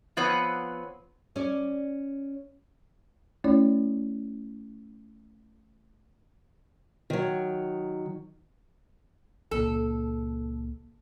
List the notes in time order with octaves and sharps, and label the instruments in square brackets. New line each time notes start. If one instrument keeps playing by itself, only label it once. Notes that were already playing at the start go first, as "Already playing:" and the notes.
[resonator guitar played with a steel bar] F3 B3 C4 B4 C#5 F#5
[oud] C#4 D5
[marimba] A3 C#4 E4 C#5 D5
[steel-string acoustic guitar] D#3 F#3
[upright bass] C#2 A#2 [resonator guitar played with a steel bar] A4